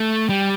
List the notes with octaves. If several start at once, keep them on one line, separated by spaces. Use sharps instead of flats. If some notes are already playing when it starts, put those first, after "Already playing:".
Already playing: A3
G3